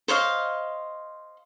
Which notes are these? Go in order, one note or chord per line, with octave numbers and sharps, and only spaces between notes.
C5 C#5 D#5 F5